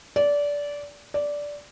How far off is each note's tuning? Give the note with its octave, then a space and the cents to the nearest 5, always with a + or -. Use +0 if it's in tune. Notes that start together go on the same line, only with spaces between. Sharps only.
D5 -20
D5 -10